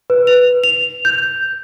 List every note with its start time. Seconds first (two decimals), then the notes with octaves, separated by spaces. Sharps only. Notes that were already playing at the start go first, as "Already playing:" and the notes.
0.10 B4
0.27 F7
0.64 F7
1.05 G6